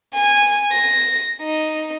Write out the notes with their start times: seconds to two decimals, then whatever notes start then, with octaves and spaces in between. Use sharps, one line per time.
0.14 G#5
0.72 A#6
1.42 D#4